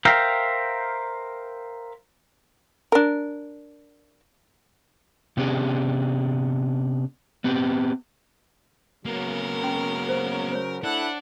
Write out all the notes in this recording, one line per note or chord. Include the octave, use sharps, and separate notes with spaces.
A#4 C5 E5 F5 G5 A#5
D4 A#4
C3 B3 C#4 D4 G4 G#4
B3 C4 G4 B4
C#3 F#3 A#3 B3 A#4
C#4 F#4 C6
G4 C5
C5 C#5
A3 D4 E4 A4 F#5 F#6